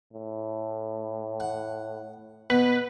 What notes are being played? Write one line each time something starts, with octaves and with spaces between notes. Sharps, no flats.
A2
F#5
B2 B4